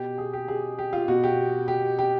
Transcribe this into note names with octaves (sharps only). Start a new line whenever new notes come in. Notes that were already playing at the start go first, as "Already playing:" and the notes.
Already playing: B2 G4
G#4
G4
G#4
G4
F4
B2 F#4
G4
G4
G4